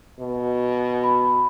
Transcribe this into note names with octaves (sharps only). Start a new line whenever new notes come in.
B2
B5